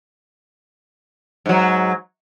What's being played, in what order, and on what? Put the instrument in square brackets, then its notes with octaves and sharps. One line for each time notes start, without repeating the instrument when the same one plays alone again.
[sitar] G#2 F#3